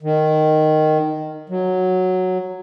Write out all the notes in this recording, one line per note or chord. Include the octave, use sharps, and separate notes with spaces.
D#3
F#3